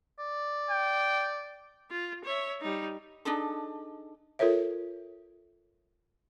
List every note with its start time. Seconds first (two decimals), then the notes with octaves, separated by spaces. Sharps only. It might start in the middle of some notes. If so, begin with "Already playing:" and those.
0.19 D5
0.70 G5
1.91 F4
2.25 C#5 E5
2.61 G3 D#4
3.25 D4 D#4 G#4 A4
4.39 F4 A4 A#4 C#5 E5